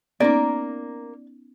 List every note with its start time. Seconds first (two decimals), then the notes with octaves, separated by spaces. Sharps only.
0.20 A#3 B3 C#4 D#4 A#4 D5